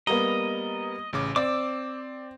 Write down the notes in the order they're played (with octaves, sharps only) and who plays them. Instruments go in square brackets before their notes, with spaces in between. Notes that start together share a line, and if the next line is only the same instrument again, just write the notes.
[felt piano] G3 A#3 B3 [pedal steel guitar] D#5 [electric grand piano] A#5
[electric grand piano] A1 C#3 D6
[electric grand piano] C4 [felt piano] D5 [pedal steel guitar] D6 E6